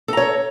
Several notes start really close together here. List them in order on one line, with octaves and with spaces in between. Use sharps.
A4 A#5 C#5